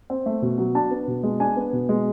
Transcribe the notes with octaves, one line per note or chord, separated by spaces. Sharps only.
C4
A3
B2
F#3
D4 A5
B3
B2
G#3
D4 G#5
B3
B2
G#3